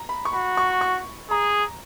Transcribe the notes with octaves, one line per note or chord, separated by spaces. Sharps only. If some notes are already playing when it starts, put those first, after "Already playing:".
Already playing: A#5
B5
C#6
F#4 B5
C#6
C#6
G#4 A#5